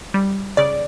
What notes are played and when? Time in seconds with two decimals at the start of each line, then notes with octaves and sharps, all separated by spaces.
0.14 G3
0.57 C#3 D5